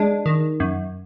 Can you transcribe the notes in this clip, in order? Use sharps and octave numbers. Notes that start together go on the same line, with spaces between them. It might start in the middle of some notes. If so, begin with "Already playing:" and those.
Already playing: G#3 D4
D#3
F#2